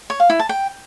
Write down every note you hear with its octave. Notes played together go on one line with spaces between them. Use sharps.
C#5
F5
E4
A5
G5